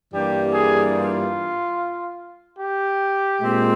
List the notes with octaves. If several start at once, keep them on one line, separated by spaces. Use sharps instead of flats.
G2 E3 G3 A#3 G4
G#4
F4
G4
A#2 G#3 C4